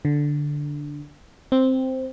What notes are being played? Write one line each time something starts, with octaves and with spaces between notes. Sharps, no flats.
D3
C4